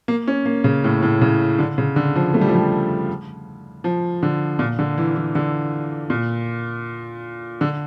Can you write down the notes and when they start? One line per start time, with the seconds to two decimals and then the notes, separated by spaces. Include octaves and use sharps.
0.08 A#3
0.28 C#4
0.46 A#3
0.64 C#3
0.84 A2
1.03 A2
1.21 C#3
1.59 D3
1.78 C#3
1.96 D3
2.16 F3
2.34 A3
2.41 G3
2.49 F3
2.55 G3
3.84 F3
4.23 D3
4.59 A#2
4.79 D3
4.98 E3
5.16 E3
5.35 D3
6.10 A#2
7.61 D3